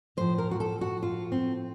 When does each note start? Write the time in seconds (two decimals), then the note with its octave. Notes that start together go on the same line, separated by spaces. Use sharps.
0.17 A2 F3 C5
0.38 A#4
0.51 F#4
0.60 A4
0.81 F#4
1.03 F4
1.32 C4